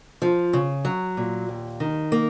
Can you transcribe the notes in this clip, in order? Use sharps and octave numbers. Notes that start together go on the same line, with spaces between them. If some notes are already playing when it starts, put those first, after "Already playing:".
F3
C#3
F#3
A#2
D#2
D#3
A#3